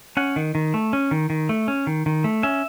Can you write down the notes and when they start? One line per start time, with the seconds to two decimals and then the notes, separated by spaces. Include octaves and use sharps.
0.17 C#4 F#5
0.36 D#3
0.55 D#3
0.74 A3
0.93 C#4
1.11 D#3
1.30 D#3
1.49 A3
1.68 C#4
1.87 D#3
2.06 D#3
2.24 A3
2.43 C#4 E5